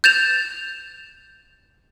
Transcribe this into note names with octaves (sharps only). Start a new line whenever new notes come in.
G6 A6 E7 F7